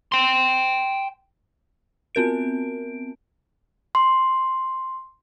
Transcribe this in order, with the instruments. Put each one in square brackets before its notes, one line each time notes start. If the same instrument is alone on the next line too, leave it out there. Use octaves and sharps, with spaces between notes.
[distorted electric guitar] G5 C6
[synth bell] B3 C4 A#4 D7
[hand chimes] C6